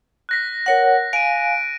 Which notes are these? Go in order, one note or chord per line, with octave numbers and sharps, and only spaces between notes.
F#6 A#6 B6
A#4 C#5 F#5
F5 G#5 D7 D#7